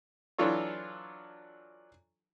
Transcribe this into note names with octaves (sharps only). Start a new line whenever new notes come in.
E3 F#3 D4 F4 A4 C#5